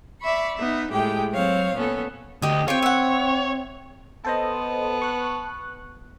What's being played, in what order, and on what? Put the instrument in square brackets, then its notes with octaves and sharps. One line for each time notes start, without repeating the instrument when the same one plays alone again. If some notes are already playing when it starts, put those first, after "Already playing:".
[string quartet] D5 E5 B5 C#6
B3 D#4 E5
A2 G#3 G4 G5
F#3 C4 C#5 F5
A#2 B3 C#4 A4
[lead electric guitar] D2 [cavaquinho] G4 D#5
[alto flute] C4 [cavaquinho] F4 G4 G5 [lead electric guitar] C#5
[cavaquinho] E5 F#5
[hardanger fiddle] B3 [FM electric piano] A4 C5 D#5 [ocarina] A5
[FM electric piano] C#6 F#6